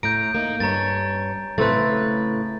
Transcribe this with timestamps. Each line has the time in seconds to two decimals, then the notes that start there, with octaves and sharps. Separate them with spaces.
0.03 A2 A#5 G6 D7
0.35 A#3 D#4
0.60 G2 C#4 C#5 A#5 A6
1.58 A2 C#3 A3 C4 B4 A6